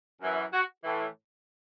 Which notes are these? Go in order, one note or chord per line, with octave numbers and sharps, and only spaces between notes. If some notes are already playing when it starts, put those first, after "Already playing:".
F#2 E3
F#4
A2 E3